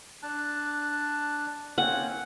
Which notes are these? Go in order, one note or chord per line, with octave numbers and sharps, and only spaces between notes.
D4 A5 F#6
A#3 C4 C#4 F#5